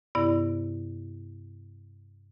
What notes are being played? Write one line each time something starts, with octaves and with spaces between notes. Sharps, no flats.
G2 C3 B3 E4 D5